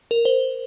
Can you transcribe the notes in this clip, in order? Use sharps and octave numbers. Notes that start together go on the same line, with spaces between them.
A#4
C5